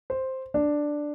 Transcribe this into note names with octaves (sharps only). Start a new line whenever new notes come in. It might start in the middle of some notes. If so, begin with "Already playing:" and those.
C5
D4 D5